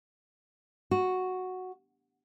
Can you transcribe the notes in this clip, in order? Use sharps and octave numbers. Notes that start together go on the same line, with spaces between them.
F#4